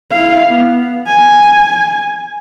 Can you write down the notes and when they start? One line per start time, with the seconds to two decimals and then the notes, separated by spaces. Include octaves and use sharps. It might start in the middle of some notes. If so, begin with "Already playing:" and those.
0.11 E4 F5
0.48 B3
1.07 G#5